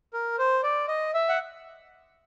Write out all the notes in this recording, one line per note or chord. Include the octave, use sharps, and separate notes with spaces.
A#4
C5
D5
D#5
E5
F#5